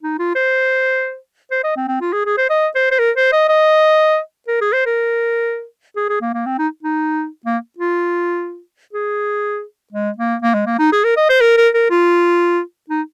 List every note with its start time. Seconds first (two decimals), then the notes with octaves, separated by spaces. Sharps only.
0.03 D#4
0.19 F4
0.35 C5
1.51 C5
1.64 D#5
1.77 C4
1.88 C4
2.01 F4
2.13 G#4
2.26 G#4
2.38 C5
2.50 D#5
2.75 C5
2.91 C5
2.99 A#4
3.16 C5
3.33 D#5
3.49 D#5
4.48 A#4
4.61 G#4
4.73 C5
4.86 A#4
5.96 G#4
6.09 G#4
6.21 A#3
6.34 A#3
6.46 C4
6.59 D#4
6.83 D#4
7.46 A#3
7.78 F4
8.93 G#4
9.93 G#3
10.18 A#3
10.42 A#3
10.54 G#3
10.66 A#3
10.79 D#4
10.92 G#4
11.04 A#4
11.17 D#5
11.29 C5
11.41 A#4
11.57 A#4
11.74 A#4
11.90 F4
12.90 D#4